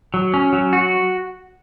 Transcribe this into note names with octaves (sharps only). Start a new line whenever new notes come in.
F#3
C#4
F#3
F#4